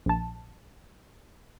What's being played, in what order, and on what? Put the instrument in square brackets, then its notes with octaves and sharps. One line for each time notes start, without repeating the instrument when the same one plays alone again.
[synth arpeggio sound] A#1 A5